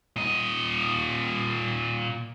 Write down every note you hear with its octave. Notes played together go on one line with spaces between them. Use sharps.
A#2 D#5